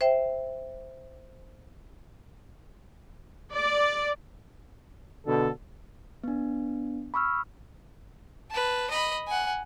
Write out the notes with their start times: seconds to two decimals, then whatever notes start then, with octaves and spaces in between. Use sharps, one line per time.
0.01 C5 E5 G5
3.53 D5
5.27 B2 D3 A4
6.24 B3 D4
7.14 B5 C#6 E6 F6
8.51 B4 A5
8.90 D#5 B5
9.27 F#5 G#5